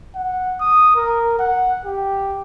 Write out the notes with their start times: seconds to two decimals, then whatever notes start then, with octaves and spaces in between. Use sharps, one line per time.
0.15 F#5
0.60 D#6
0.95 A#4
1.39 F#5
1.85 G4